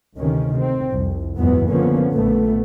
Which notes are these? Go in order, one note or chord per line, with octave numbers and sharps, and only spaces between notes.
D2 C3 D#3 C#4
C4
C2 F2
F#1 E2 G#2 E3 F#3 B3
D3 F3 A#3 B3 C#4
A#1 A#2 A3 B3